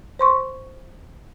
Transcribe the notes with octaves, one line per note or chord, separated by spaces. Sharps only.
C5 C6 C#6